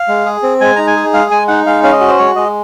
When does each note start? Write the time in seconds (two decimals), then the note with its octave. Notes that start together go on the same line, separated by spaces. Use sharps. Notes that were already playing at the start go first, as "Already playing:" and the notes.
Already playing: F5
0.08 G#3
0.25 G#4
0.43 C4
0.61 G#3 G#5
0.76 D#4 A#5
0.87 G#5
0.96 G#4
1.14 G#3 F5
1.31 G#3 G#5
1.48 D#4 F#5
1.66 G#3 F5
1.83 C#4 F5
1.92 D#5
2.01 F#4
2.08 C5
2.18 G#3 C#5
2.36 G#3 D#5